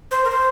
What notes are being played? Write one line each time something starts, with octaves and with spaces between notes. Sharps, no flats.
C5
A#4
C5